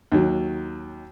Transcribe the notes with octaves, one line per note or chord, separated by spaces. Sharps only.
D#2 F#3